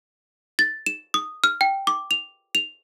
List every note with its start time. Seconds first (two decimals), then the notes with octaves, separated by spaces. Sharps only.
0.59 A6
0.86 E7
1.14 D#6
1.44 F6
1.61 G5
1.87 D6
2.11 F7
2.55 F7